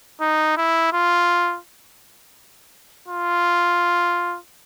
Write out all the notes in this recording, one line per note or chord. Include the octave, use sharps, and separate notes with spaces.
D#4
E4
F4
F4